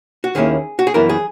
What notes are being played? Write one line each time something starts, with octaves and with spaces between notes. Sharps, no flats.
F#4
D#2 D#3 A#3 C#4 E4 G#4
F#4
G#4
F#2 E3 B3 E4 A#4
G#4